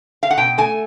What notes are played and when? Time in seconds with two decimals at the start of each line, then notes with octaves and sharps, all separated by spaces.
0.23 F5
0.30 F#5
0.37 B2 G5
0.58 A3 G#5